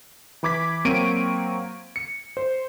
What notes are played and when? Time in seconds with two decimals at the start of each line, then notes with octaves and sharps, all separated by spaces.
0.43 E3 B5 D6 G#6 B6
0.85 F#3 A#3 C4 C#6 D7 D#7
1.96 C#7
2.37 C5